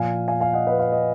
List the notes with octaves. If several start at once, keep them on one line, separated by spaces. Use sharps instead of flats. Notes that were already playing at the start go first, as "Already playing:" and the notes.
Already playing: A#2 F3 F5 G#5
F5 G#5
F5 G#5
D#5 F#5
B4 D#5
F5
D#5